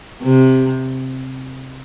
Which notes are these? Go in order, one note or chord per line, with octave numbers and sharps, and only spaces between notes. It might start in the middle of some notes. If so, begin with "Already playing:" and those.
C3